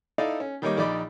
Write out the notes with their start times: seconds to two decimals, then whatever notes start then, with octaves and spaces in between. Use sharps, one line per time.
0.18 D#4 E4 A4 D5 D#5 F5
0.40 C#4
0.62 D#3 G3 A#3 C#5 D#5 D6
0.77 A#1 D#4 D5 D#5 B5 D6